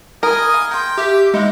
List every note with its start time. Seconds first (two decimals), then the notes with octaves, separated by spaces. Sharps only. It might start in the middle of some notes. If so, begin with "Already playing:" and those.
0.23 A#4 D#5 G#5 A#5 B5 D#6
0.54 F5
0.71 G5 A#5 C6
0.97 G4 E5 F5
1.34 G#3 C4 D#4 E4 F5